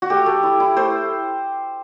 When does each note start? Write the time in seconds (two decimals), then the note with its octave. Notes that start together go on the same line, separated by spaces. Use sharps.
0.02 F#4
0.10 A3 G4
0.26 A3
0.43 E4
0.60 E4
0.77 A3 C5